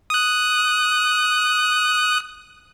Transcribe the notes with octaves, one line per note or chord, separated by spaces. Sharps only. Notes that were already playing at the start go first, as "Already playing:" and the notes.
D#6 F#6